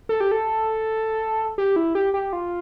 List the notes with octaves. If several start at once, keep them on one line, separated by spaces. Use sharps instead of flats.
A4
G4
A4
G4
E4
G4
G4
F4